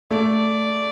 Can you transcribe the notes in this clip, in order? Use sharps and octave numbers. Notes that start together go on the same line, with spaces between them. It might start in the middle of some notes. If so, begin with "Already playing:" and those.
A3 D5